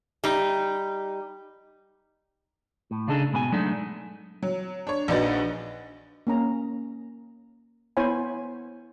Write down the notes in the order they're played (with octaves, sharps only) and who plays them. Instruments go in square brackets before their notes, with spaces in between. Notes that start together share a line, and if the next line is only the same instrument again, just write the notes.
[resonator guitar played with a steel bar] G3 D#4
[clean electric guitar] A2
C#3 D4 D#4 G#4 A4
G#2 B2 A4 G#5
F#3 G#3 A3 D4 D#4
[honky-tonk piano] F#3
D4 C#5
A#1 D4 D#4 F#4 B4 A6
[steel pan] A#3 C#4 A#5
B3 E4 C5 C#5 G#5 B5